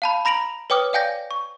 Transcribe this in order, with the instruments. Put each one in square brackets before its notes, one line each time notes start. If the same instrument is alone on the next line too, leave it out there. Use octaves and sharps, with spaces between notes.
[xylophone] F5 A5 B5
A#5 B5 A#6 D7 F7 F#7
B4 C#5 G5 D6 D#6 F6
D5 F5 G5 G#5 G6 A#6
C#6